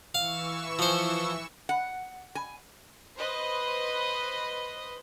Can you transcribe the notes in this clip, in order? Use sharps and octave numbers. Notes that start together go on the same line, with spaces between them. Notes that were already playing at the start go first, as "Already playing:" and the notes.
E3 F5 C#6 E6
F3 C5
F#5
G#5
B4 C5 D#5